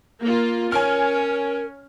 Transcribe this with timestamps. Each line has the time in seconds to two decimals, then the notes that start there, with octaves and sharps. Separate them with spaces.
0.21 A#3 F4
0.72 C#4 A#4 G#5 F6